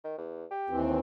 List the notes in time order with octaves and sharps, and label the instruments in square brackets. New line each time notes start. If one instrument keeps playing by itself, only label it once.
[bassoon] D#3
E2
G4
[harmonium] D#2 E3 C4